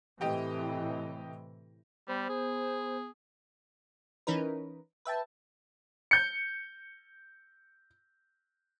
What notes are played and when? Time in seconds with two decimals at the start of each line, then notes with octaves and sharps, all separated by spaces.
0.21 A2 C3 E3 G4 D#5 G5
2.08 G3 B3 C5
2.29 G#4
4.27 E3 C#4 D#4 A#4 B4
5.05 B4 E5 G5 A5
6.11 G6 C#7